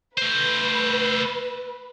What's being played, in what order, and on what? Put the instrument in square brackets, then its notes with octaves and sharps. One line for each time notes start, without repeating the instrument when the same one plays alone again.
[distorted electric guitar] A3 C5 [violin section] B4